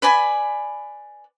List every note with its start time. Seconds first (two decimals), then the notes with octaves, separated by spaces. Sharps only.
0.02 B4 D5 G#5 B5